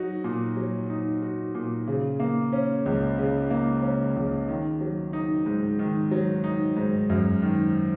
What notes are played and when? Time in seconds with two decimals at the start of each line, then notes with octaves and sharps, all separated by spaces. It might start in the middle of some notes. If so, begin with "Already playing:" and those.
Already playing: F#3 D#4 F#4
0.24 A#2
0.57 F#3
0.90 D#4
1.22 F#4
1.55 A#2
1.87 C#3
2.20 A#3
2.53 C#4
2.86 C#2
3.18 C#3
3.50 A#3
3.82 C#4
4.16 C#2
4.48 D#3
4.81 F#3
5.13 D#4
5.46 G#2
5.79 D#3
6.11 F#3
6.44 D#4
6.77 G#2
7.10 F#2
7.42 D#3